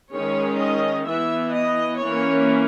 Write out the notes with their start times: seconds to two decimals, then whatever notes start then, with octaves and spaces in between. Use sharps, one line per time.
0.12 D#3 G#3 C#4 C#5
0.59 D#5
1.06 E3 B3 E5
1.54 D#5
2.01 E3 A#3 C#4 C#5